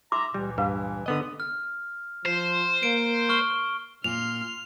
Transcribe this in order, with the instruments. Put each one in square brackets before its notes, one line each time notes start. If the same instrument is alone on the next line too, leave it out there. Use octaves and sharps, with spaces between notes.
[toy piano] D#4 C6 D6 [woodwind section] E5 A#5
[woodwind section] C#2 A#2 E3 [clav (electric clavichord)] G3
[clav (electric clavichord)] G2 [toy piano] B4 F5
[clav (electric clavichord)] D3 B3 D#5 [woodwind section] D#6
[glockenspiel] F6
[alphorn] F3 [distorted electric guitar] C5
[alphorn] A#3 [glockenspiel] D7
[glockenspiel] C#6 F6 G7
[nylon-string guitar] A#2 [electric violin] C6 F6 [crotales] F7